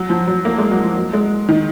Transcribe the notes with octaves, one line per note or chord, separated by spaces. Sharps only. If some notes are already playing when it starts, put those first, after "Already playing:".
Already playing: F#3
F3
F#3
A#3
G#3
F#3
F3
F#3
G#3
D#3